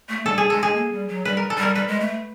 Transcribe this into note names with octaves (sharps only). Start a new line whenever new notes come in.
A3
G3 A4
G#4
G#3 A4
G#4
A#3
G3
F#3
G3 B4
A#4
A4
G3 A#4
G3 B4
G#3
A3